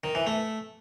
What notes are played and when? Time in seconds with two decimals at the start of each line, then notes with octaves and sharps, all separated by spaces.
0.04 D#3
0.15 E3
0.27 A3